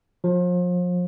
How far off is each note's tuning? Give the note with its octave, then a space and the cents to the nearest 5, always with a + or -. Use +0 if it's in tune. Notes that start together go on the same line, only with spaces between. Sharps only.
F3 +35